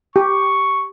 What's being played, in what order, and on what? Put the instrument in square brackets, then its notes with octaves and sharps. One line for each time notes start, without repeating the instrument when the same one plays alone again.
[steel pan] G4 [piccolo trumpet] C#6